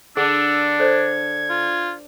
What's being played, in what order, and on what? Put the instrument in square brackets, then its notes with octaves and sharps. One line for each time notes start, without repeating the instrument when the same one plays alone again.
[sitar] D3 [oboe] D4 [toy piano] G#4 [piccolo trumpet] E6
[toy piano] A4 C5 D5 [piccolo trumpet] G#6
[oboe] F4